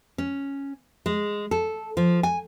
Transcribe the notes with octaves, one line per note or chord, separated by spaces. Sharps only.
C#4
G#3
A4
F3
G#5